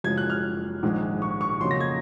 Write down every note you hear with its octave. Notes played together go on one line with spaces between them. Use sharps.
F#1 F#2 F3 G#3 G#6
F#6
F6
A#1 G#2 D#3 G#3
C#6
C#6
F2 C#3 F#3 A#3 D#4 C6
A#6
G#6